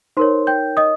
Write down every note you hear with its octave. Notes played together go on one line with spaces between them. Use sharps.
D#4 A#4 C5 C#5 C6
G5 G6
D#5 D#6